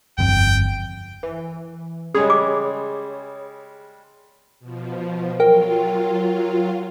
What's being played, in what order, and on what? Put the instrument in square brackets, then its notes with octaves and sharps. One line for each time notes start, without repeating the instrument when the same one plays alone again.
[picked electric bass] G1 F2 [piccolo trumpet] G5
[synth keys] E3
[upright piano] C#3 G3 G#3 [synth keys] G#4 C#5
[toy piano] D6
[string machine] B2 F3
[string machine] F#3 F4 [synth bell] A#4 G5